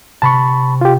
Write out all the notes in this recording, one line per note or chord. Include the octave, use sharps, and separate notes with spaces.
C3 A5 B5 C#6
F4 G4